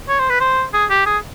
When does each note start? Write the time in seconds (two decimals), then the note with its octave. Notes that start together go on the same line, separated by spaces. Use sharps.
0.09 C#5
0.20 C5
0.30 B4
0.40 C5
0.74 G#4
0.90 G4
1.06 G#4